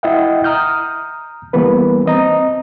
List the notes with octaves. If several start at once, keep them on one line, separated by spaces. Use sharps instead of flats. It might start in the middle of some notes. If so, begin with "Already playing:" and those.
E4 D#5 E5 F#5 G5
A#5 D#6 F6 G6
E3 G3 A#3 B3 B4
C4 D#5 A#5